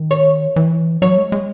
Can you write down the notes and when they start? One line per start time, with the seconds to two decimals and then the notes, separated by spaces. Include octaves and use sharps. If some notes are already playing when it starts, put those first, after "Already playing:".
Already playing: D#3
0.11 C#5
0.56 E3
1.02 F#3 C#5
1.17 G#3
1.32 G#3